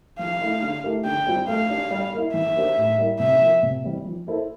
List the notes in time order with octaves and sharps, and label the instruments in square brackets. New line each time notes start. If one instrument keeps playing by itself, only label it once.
[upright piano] F3 [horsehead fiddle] F5
[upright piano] A3 E4
D3
A3 E4 G4 A#4
[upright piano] D3 [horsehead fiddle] G5
[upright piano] G3 C4 F4
[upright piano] A3 [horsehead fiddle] F5
[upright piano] D4 G4
G3
A#3 E4
[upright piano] E3 [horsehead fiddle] E5
[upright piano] A#3 D4 G4 C5
A2
G3 A#3 E4
[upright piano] C3 [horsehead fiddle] E5
[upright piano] F3 A#3
C3
E3 G3 C4
F3
A#3 E4 A4 C5